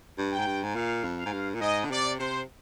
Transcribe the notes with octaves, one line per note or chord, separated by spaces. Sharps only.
G2
G5
G#2
G2
G#2
A#2 F5
F2
F5
G#2
G2
A#2
G#2 D#5
D3
C3 D5
C3 C5